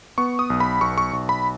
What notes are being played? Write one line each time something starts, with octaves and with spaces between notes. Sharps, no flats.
B3 C#6
D#6
B1
B5
B1 C#6
C#6
B1
B5